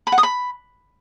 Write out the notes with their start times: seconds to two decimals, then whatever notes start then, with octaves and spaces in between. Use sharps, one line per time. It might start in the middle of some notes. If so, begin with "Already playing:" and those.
0.07 B5
0.12 F#5
0.18 D#6
0.23 B5